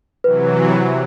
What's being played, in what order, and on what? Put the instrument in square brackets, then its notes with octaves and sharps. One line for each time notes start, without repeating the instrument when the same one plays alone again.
[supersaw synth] C3 E3 F#3 [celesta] B4